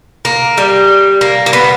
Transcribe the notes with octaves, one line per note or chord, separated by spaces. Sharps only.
A#3
G3
A#3
A#3
B3